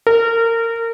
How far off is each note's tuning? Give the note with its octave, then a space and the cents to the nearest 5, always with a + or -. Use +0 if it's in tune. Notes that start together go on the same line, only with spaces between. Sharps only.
A#4 -25